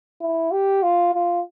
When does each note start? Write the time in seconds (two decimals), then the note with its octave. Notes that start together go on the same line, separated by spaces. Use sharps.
0.21 E4
0.51 G4
0.83 F4
1.14 F4